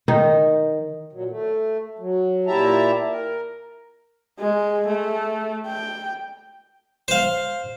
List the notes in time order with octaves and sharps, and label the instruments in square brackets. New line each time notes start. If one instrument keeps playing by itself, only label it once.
[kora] D#3 D#4
[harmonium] A#2 F#3
A3
F#3
A#2 E4 G4 E5 A5 A#5
A#4
[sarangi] G#3
A3
G5
[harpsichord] C5 F5